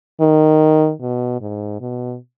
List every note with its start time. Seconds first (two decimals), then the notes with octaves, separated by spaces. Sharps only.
0.21 D#3
1.02 B2
1.41 G#2
1.80 B2